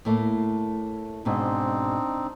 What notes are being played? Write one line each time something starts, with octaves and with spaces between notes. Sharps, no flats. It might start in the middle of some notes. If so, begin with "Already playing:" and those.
A2 A3 A#3
G#2 B2 C4 D4 D#4